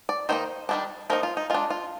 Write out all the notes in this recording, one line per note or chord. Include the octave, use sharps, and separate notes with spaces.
D5
D#3 A#3 D#4 C5
D#3 G3 A#3 D4
F3 A#3 D#4 A#4
F4
D#4
G#3 D4 F4
F4